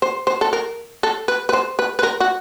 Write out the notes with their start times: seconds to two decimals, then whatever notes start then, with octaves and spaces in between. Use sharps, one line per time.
0.02 C5
0.27 C5
0.41 A4
0.53 A#4
1.03 A4
1.28 B4
1.49 B4
1.53 C5
1.79 B4
1.99 B4
2.03 A#4
2.20 F#4